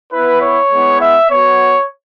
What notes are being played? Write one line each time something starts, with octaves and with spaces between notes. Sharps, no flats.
B3 E4 B4
C#5
G#3 B3 E4
E5
B3 F#4 C#5